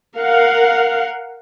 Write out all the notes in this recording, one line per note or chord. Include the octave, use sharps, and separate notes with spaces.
A#4 F5 F#5